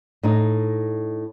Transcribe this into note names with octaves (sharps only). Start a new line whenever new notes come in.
A2 D#4